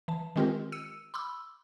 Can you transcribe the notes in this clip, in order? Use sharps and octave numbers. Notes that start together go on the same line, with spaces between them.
E3 A5
D#3 G#3 C4 F4 G4 A#4
E6 C#7 D#7
B5 C6 D6 E6